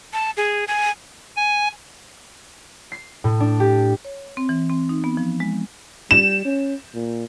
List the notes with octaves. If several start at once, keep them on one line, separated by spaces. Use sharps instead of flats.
A5
G#4
G#5
G#5
C7
A2
D4
G4
C#5
C4
E3
C4
D#4
B3
F3
G#3
G3 E7
C#4
A#2